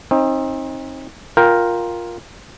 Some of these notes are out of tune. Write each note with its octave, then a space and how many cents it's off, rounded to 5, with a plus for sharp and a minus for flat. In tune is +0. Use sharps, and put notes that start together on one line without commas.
C4 +35 D#4 +15
F4 +10 A#4 +5 G5 +0